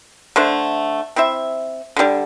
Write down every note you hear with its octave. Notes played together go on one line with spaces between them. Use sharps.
D3 A3 D4 C5
C4 E4 C5 E5
D3 G3 D4